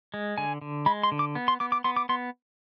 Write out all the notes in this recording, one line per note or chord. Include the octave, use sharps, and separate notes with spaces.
G#3
D3 G#5
D3
G#3 B5
C6
D3
D6
B3
C6
B3 D6
D6
B3 C6
D6
B3 C6